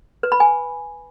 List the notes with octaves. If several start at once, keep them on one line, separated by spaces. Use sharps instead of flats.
B4
B5
G#5